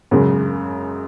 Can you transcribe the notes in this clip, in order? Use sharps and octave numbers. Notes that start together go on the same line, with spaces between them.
F#2 C#3 G#3